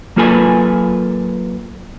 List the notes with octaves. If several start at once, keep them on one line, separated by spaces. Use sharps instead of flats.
F#3 A#3 F4 A4 B4 G#5